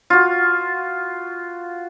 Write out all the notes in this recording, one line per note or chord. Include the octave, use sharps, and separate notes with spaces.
F4 F#4